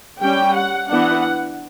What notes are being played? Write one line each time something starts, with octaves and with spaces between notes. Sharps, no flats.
G3 C#4 G5
F#5
E3 B3 D4 F#5